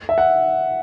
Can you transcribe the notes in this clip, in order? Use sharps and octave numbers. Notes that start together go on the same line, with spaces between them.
E5
F#5